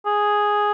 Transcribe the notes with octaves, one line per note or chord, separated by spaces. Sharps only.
G#4